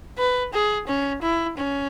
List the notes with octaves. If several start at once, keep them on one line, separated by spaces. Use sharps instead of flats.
B4
G#4
C#4
E4
C#4